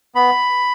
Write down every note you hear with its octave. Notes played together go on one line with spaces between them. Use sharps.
B3 B5